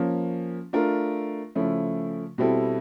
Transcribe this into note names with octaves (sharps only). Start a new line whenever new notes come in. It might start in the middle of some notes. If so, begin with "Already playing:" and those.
Already playing: F3 A#3 C#4
A3 D4 F4 A#4
C#3 F3 A3 C#4 E4
B2 G3 C4 E4 A4